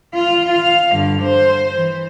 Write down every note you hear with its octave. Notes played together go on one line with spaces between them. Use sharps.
F4 F5
F5
G2 D3
C5
E3